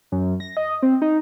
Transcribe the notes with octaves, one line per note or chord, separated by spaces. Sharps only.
F#2
A#6
D#5
C4
D#4